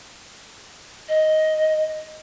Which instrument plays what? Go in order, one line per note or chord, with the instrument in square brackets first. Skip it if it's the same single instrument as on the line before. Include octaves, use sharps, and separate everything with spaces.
[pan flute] D#5